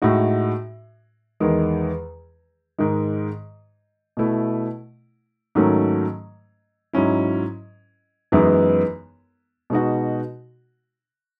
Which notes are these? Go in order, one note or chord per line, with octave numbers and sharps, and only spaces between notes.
A2 G#3 D#4 F#4
E2 D#3 G#3
G#2 D#3 G#3
B2 A3 E4
G#2 D#3 F#3 A3 C#4
G#2 F#3 C#4 E4
F#2 E3 G#3 B3 D#4
B2 G#3 D#4 F#4